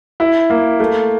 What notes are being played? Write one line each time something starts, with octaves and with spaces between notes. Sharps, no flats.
E4
A#3
A3